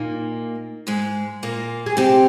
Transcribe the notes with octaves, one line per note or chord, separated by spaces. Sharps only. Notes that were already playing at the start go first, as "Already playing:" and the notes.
Already playing: A#2 A#3 D#4
G#2 G#3
A#2 A#3
G#4
C3 C4 G4